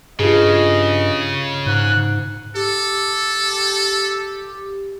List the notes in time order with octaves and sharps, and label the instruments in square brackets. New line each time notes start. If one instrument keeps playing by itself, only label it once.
[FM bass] G2 [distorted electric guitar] C#3 [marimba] F4 G4 G#4 [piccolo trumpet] D#5
[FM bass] G#2 [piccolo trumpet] F#6
[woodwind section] G4 [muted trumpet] A4